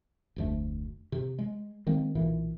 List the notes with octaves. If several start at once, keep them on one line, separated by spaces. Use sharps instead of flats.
F1 D2 A3
C3
G#3
D#3 G#3 A#3 C4
B1 A#2 E3